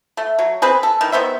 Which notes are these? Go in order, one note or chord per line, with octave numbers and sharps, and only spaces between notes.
A3
F#3
C4 G#4 B4
A4
D#3 E3
D#3 B3 C5 E5